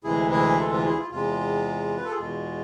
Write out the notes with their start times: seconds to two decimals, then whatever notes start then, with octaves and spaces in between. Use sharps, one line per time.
0.04 D2 C3 E3 G#3 E4 G#4
0.31 E4 G#4
0.57 F4 A4
0.71 F4
0.84 E4 G#4
0.98 F4
1.11 E2 C3 G#3 F4
1.97 B4
2.05 A4
2.11 G#4
2.18 E2 B2 G#3 F4